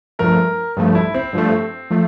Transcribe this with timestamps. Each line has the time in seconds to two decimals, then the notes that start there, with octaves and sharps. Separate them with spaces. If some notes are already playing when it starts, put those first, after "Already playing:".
0.19 G2 F3 A3 A#4
0.77 G2 F3 A3
0.95 E4
1.14 C4
1.33 G2 F3 A3
1.90 F3 A3